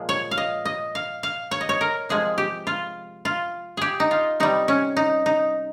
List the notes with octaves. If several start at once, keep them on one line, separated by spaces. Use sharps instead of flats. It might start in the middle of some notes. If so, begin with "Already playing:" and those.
Already playing: A#2 F3 G#3
C#5
F5
D#5
D#5
F5
F5
C#5
D#5
C#5
A#4
C3 F3 G#3 G#4
G4
F4
F4
G4 G#4
D#4
F4
C3 G3 D#4
C#4
D#4
D#4